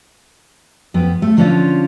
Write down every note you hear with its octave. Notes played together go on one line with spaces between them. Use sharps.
F2 B3
A3
D3 F3 C#4 D4 F4